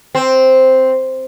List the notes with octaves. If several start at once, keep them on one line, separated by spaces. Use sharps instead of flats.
C4